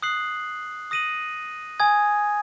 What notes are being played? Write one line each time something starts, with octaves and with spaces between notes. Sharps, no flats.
D#6 F#6 C7 F#7
D#6 A#6 D#7 F#7
G#5 D#6 G#6